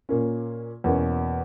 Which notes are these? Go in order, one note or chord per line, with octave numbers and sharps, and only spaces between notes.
A#2 A#3 C#4
E2 B2 A#3 C#4